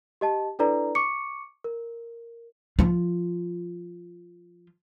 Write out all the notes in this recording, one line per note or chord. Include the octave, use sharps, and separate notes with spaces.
G4 D#5 A5
D4 E4 A4 B4 D5 A#5
C#6 D6 C#7
A#4
F3 F4